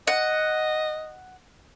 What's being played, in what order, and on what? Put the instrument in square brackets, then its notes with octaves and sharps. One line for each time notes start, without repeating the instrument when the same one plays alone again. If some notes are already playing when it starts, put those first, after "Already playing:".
[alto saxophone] D#5 [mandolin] F#5